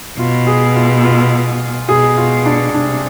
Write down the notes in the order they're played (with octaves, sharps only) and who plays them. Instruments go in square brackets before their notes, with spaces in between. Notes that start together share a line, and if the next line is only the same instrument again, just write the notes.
[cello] B2 [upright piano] F4
[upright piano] G#4
F4
F4
[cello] B2 [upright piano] G#4
[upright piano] F4
D4
[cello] C3 [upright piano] D4